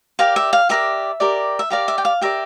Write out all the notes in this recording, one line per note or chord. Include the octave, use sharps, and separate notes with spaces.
G4 A#4 D5 F5
E5
F5
G4 A#4 D5 E5
G4 A#4 D5
E5
G4 A#4 D5 F5
E5
G5
F5
G4 A#4 D5 E5